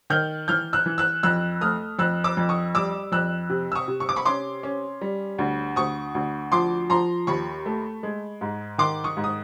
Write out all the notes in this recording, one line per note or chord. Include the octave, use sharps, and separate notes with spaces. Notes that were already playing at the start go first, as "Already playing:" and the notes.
D#3 F6 G6
E3 F6 G6
E6 F#6
E3
E6 F#6
F2 E6 F#6
A3 D#6 F6
F2 E6 F#6
D6 E6
F2
C#6 D#6
G3 D6 E6
F2 E6 F#6
C3
E6
C#6 D#6
C3
C#6
D6
B5 C#6
C#4 C6 D6
C#4
G3
D2
D2 C#6 D#6
D2
F3 C6 D6
F3 A#5 C6
D#2 B5 C#6
A3
G#3
G#2
D#3 C6 D6
C#6 D#6
G#2
D#6